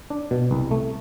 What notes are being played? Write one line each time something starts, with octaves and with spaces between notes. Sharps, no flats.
D4
B2
C2
A3